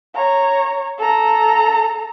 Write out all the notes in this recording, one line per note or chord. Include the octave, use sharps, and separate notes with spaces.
C#5 A#5
A4 A#5